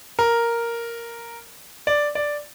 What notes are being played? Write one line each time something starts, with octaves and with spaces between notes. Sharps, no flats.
A#4
D5
D5